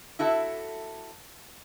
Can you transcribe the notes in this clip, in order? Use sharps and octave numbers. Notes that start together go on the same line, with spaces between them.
E4 F#4 A4 E5